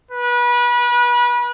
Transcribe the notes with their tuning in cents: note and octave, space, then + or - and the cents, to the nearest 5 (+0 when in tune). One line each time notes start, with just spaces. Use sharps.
B4 -30